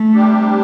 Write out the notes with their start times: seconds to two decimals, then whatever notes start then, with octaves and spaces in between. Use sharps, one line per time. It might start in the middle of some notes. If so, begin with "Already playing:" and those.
Already playing: A3
0.15 C3 G3 D4 G4